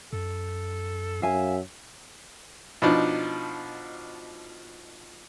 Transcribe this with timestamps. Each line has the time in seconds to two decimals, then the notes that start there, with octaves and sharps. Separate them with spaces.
0.13 F#2 A4
1.22 F#2 E5 F5 G#5
2.82 B2 F3 D4 D#4